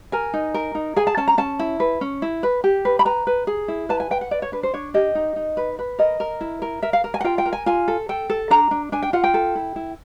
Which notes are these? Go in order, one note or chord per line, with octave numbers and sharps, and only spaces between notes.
A#4 G#5
D#4
A#4
D#4
G#4 G#5
A5
C#4 A5
A#5
C#4 A5
E4
B4
C#4
E4
B4
G4
B4
B5
B4 A#5
B4
G#4
E4
B4 A5
G#5
B4 G5
F#5
B4 D5
C#5
D4 B4
C5
D4 C#5
G4 D#5
D#4
D#4
B4
B4
A#4 D#5
A#4
E4
A#4
A#4 E5
F5
A#4
G#5
F#5
F4 G5
G5
A#4
G#5
F4 G#5
A4
A4 G5
A4
D4 A#5
D4
D4 G#5
G5
F4 F#5
G5
A4
E4
E4